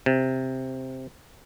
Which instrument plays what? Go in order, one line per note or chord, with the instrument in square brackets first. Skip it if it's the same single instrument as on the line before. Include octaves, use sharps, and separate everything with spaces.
[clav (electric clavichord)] C3